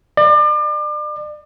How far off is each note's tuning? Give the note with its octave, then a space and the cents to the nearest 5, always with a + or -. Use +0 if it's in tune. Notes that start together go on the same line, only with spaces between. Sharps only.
D5 +35